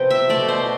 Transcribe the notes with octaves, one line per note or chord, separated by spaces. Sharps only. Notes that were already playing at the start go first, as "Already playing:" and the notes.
Already playing: C3 F3 B3 G5
E5
B2 A3 D5
C5